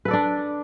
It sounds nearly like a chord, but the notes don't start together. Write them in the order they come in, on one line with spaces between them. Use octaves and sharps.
B4 A4 D5 D4